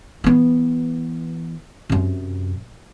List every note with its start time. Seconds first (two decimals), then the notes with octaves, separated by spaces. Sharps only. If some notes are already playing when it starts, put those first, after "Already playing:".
0.24 E3 B3
1.89 F#2 C3